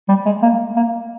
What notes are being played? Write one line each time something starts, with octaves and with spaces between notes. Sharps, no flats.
G3
G#3
A#3
A#3